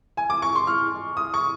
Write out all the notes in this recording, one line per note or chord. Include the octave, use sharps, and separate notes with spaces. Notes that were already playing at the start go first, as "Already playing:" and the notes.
G#5
D6
C#6
C6
F6
D#6
C#6